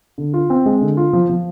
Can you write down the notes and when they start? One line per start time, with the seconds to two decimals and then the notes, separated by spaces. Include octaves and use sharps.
0.18 D3
0.34 F4
0.50 C4
0.66 G#3
0.81 D3
0.97 F4
1.13 F3
1.29 F3